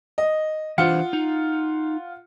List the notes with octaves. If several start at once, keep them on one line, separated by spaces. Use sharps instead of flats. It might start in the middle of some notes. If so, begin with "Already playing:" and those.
D#5
E3 D4 F4 C5 F#5 C#7
D#4